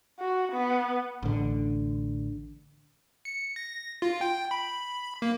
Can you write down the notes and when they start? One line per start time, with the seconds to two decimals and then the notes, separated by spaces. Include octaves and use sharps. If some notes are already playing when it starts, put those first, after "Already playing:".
0.19 F#4
0.52 B3
1.23 A1 D3
3.25 C#7
3.56 A#6
4.02 F4
4.21 G5
4.51 B5
5.22 A#3